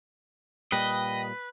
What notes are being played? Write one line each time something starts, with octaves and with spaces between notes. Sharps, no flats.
A#2 G3 B4 D#5 G5